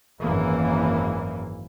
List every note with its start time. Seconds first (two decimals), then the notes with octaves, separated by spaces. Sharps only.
0.22 G#1 F#2 E3 A#3